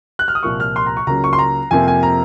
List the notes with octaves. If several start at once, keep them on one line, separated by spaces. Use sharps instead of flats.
F#6
F6
D#6
C2 A#2 F3 A#3 C#6
F6
C6
A#5
C#6
C#2 C#3 F#3 A#3 A#5
C#6
C6
A#5
F2 C3 F3 A#3 G#5
G#5
A#5